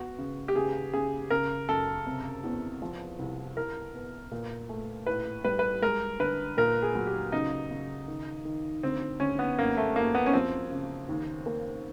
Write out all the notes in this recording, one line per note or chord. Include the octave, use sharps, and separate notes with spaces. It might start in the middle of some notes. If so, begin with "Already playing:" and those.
Already playing: B3 F#4
C#3
G4
C#3 G#4
C#3 G#4
C#3 A#4
F#2 A4
C3
E2
F3
C2
E4 A#4
B3
A#2
A3
A2 B4
G3 B4
B4
G#3 A#4
D3 B4
A#2 A#4
G#4
F#3
G4
C#3 D#4
C#3
D#3
D#3
D2 C4
D2 C#4
B3
F#2 A#3
A3
F#2 A#3
B3
C#4
F3 C4
C#3
D#2
A#3